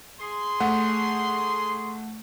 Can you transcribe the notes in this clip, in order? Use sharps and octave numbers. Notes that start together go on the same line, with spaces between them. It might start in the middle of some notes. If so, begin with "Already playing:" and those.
G#4 C6
A3 F#5